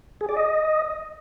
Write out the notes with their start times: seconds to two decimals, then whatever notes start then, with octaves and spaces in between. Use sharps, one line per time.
0.21 G#4
0.29 D5
0.37 D#5